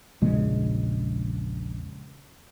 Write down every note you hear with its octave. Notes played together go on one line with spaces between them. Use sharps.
A#1 E2 C#3 G#3